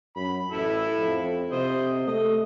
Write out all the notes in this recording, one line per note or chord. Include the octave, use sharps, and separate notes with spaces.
F#2 B5
A1 E4 A4
F2
C3 C5 D#5
A3 D#5